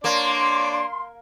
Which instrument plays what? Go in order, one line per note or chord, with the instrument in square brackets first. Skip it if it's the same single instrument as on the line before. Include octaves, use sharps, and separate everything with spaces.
[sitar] A#3 [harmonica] D4 C#5 D5 [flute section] C6